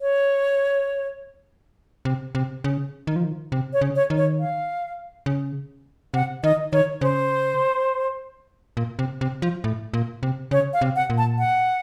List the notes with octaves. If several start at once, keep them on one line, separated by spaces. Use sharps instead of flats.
C#5
C3
C3
C#3
D#3
F3
D#3
C3
C#5
C#3
C#5
D#3
C#5
F5
C#3
C3 F#5
D#3 D#5
D#3 C#5
C#3 C5
A#2
C3
C3
F3
A2
A#2
C3
C#3 C#5
F5
C3
F#5
A#2
A5
F#5